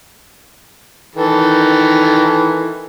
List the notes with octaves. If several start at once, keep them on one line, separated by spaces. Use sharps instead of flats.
D#3 E3 A4